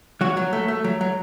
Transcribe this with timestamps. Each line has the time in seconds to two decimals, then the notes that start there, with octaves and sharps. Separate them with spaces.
0.21 F#3 F#4
0.37 F#3
0.53 A3
0.68 A3
0.84 F#3
1.01 F#3